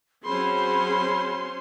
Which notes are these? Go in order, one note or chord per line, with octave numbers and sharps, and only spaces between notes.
F#3 C4 C#4 G#4 C5 B5 C6